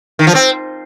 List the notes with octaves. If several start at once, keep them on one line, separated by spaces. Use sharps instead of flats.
D#3
F3
C4